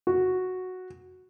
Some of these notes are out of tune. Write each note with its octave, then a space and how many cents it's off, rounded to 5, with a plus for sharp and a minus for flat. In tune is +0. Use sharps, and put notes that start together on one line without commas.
F#4 -5